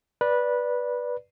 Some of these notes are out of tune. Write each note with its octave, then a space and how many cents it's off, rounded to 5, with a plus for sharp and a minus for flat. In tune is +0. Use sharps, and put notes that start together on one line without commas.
B4 -15 D5 +0